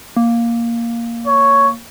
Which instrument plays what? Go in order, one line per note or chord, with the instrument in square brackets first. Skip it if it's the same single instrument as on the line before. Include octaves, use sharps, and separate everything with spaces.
[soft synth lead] A#3
[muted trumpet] C#5